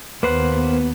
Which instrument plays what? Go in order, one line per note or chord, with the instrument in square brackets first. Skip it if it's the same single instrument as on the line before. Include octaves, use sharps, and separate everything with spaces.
[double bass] D#2 [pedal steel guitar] A#3 C5 F#5 [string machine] B3 [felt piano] B4